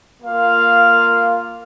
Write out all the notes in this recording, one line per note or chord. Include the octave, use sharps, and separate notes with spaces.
A#3 F4 F5